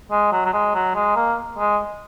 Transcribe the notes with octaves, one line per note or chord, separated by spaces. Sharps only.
G#3
F#3
F#3
G#3
F#3
G#3
A#3
G#3